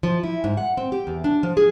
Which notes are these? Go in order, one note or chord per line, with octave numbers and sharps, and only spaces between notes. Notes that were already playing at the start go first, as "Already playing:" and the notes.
F3
E4
G#2
F#5
C4
G4
E2
D4
F3
G#4